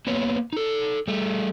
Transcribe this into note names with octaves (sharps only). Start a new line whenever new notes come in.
A#3 B3 B4 C#5
D#4 A4
G3 A3